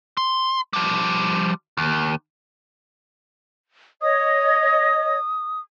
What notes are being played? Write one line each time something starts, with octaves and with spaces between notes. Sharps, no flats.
C6
F3 G3
D#2
C#5 D#5 D#6